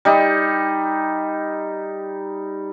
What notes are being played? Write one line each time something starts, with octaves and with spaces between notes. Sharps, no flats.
G3 D#4